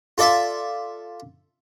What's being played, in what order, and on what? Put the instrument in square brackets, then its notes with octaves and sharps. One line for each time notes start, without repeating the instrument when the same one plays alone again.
[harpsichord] F4 A4 D5 E5